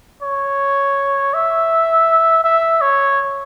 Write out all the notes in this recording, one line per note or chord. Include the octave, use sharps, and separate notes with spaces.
C#5
E5
E5
C#5